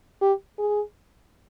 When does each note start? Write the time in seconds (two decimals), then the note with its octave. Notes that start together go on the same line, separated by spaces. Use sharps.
0.21 G4
0.59 G#4